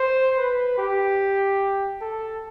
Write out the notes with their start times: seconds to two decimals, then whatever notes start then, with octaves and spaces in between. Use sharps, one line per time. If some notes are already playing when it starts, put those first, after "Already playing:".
Already playing: C5
0.37 B4
0.78 G4
2.01 A4